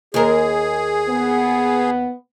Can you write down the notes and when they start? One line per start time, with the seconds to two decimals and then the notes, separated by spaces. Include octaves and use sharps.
0.14 D#2 G#4 A#4
1.09 B3